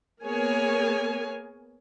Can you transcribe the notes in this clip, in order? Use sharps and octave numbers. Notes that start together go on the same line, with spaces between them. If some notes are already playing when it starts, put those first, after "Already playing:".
A#3 B3 G#4 A#4 C#5 G#5